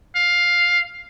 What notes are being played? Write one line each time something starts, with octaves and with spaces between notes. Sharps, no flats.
F5